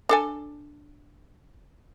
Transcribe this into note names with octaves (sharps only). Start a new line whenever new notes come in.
D4 A4 G#5